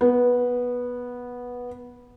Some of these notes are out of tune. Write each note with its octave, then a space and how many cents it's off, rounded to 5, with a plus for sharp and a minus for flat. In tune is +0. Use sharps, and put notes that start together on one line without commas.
B3 -10